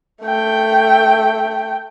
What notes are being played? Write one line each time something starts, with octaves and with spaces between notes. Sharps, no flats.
A3 G5